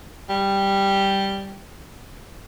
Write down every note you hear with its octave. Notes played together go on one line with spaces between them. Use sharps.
G3